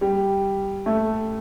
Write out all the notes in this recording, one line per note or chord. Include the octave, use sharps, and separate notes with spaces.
G3
A3